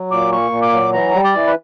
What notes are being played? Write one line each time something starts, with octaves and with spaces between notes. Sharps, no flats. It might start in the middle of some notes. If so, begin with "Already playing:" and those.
Already playing: F#3
A#2 D6
A#3 C#6
A#2
D6
F#3
E3 A#5
G3
D5
E3
B4